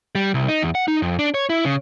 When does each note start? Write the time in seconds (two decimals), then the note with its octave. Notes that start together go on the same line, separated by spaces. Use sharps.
0.15 G3
0.34 C2
0.48 D#4
0.62 E2
0.75 F#5
0.88 D#4
1.02 F2
1.19 D4
1.34 C#5
1.49 E4
1.65 C#3